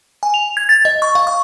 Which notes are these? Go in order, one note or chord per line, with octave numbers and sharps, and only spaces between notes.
G#5
F7
G#6
A6
D#5
C#6
F5
C#6